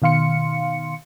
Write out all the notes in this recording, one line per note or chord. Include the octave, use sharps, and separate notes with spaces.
B2 D#3 F5 C6 C#7